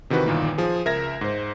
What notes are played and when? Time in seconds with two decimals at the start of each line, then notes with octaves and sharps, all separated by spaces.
0.10 C3 D#3 E3 F#4 B4
0.26 G1 A#2 D#3 E3 A#3
0.58 F3 G#4
0.86 C#2 A#4 E5 G#6 A#6
1.21 G#2 C5